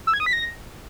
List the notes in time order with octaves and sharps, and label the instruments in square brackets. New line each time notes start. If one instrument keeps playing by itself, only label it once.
[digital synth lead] E6
G#6
D#6
B6
A#6